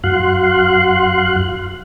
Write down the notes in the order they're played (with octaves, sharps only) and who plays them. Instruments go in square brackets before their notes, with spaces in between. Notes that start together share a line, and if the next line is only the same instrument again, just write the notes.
[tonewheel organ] F#2 F#4 F5 C6 F#6